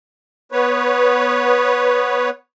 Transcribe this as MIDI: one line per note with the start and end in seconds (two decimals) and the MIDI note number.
0.52 2.30 59
0.52 2.30 71
0.52 2.30 73